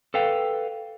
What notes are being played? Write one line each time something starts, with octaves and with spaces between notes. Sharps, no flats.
A4 B4 F5 G5